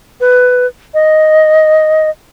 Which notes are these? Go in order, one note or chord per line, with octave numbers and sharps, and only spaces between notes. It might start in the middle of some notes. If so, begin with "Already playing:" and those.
B4
D#5